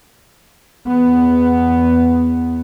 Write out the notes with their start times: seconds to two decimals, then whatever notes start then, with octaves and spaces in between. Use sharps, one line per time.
0.86 E2 B3